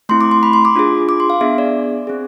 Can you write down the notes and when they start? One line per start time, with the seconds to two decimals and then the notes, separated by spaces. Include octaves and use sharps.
0.09 A3 C4 E4 C6
0.21 D6
0.31 C6
0.43 B5
0.53 C6
0.65 D6
0.76 D4 F4 G#4
1.09 D6
1.20 C6
1.30 F5
1.41 B3 D4 G#4 E5
1.58 D5
2.07 C4 G#4